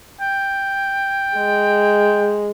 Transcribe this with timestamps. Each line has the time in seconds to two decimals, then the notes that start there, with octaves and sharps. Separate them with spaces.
0.21 G5
1.36 G#3